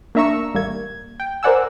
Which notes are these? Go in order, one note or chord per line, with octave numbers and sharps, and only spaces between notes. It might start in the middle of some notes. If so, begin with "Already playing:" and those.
A#3 D4 E5 A#5 C#6 E6
A1 G3 A#3 G#6
G5
A#4 C5 D5 F#5 G#5 E6